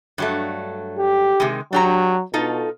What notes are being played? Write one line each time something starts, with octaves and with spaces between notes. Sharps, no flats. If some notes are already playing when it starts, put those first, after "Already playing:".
G2 F#3 A3
G4
C3 D#3 G#3
F#3 D4 G4 A#5
B2 D#4 F4 A4